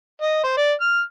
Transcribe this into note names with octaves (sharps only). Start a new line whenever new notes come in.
D#5
C5
D5
F6